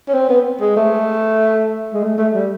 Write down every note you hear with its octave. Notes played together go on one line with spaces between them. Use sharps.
C#4
C4
B3
G#3
A3
G#3
A3
A3
G3